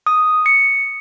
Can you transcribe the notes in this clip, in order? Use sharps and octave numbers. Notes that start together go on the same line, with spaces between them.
D#6
C#7